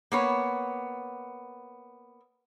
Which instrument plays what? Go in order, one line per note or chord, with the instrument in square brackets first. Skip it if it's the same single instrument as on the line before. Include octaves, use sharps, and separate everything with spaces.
[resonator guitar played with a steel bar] A#3 B3 C#5